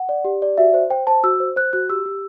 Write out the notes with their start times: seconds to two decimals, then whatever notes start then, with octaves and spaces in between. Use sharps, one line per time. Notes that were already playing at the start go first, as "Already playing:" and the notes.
Already playing: F#5
0.09 D5
0.25 G4
0.42 D5
0.58 F#4 E5
0.74 C5
0.90 C5 G5
1.07 C5 A5
1.23 F#4 E6
1.40 C5
1.56 C5 F#6
1.73 F#4 F#6
1.90 G4 E6
2.06 G4